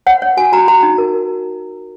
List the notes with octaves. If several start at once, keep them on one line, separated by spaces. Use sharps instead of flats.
C#5 F#5
C#5
F#4 G#5
F#4 A#5
F#4 A#5
D#4
A#4